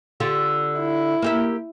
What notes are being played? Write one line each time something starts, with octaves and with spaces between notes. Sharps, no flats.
D3 F4 G4
E4
A#3 G4 E5